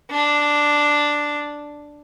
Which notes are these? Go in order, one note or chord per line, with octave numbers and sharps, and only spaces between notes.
D4